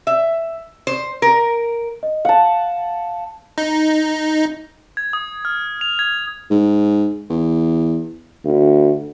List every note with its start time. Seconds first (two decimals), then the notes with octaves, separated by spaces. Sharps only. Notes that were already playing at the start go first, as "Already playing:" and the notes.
0.07 E5
0.87 C5
1.22 A#4
2.03 D#5
2.25 F5 F#5 A5
3.58 D#4
4.97 G#6
5.13 D#6
5.45 F6
5.81 F7
5.99 G#6
6.51 G#2
7.30 E2
8.45 D2